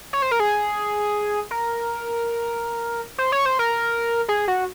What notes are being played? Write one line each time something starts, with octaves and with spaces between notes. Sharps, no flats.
C#5
C5
A#4
G#4
A#4
C5
C#5
C5
A#4
G#4
F#4